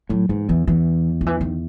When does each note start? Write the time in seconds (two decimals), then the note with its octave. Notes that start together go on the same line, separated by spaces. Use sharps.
0.09 A2 F#3
0.29 G#2 E3
0.49 E2 E3
0.67 E2 E3
1.21 D#3
1.26 E3
1.41 D#3